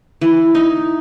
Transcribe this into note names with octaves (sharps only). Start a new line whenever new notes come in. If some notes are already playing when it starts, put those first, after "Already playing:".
E3
D#4